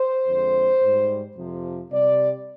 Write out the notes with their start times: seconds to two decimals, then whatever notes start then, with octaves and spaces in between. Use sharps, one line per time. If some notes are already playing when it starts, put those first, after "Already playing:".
Already playing: C5
0.27 F2 D3 G#3
0.81 G#2 G3
1.36 F2 C3 F3
1.91 C3 G3 D5